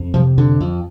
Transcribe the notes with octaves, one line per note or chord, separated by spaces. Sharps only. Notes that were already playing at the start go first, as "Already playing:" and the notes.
Already playing: F2
C3 F3
F2 D3
F2